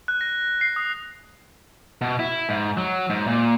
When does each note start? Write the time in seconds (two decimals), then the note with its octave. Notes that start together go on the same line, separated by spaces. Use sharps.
0.08 F#6
0.21 A#6
0.61 C7
0.76 D#6
2.01 B2
2.19 E4
2.49 G#2
2.77 F#3
3.10 G#2
3.27 A#2